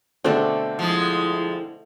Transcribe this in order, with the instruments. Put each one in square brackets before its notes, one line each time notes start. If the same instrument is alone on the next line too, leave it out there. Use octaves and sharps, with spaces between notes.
[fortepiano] B2 D3 C4 [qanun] A3 D4
[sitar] F3 G#3 [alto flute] E4